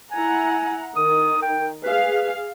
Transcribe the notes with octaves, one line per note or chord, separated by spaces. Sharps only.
E4 F#5 G#5 A#5
D#3 D#6
G5
G#4 B4 F5